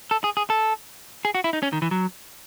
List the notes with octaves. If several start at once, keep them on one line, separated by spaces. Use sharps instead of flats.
A4
G#4
G#4
A4
G#4
F#4
E4
D#4
C#4
D#3
E3
F#3